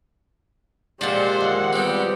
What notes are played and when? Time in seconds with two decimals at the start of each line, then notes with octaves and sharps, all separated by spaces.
1.01 A#2 F3 G#3 D4 G4 C5 F#5
1.41 D#2
1.73 G3 B3 C4 G4